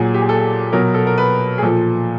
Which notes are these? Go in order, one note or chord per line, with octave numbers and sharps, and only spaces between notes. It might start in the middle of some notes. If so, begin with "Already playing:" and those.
Already playing: A#2 F#3 G#4
G4
G#4
A4
B2 F#3 A#4
A4
A#4
B4
G#4
A#2 F3 A4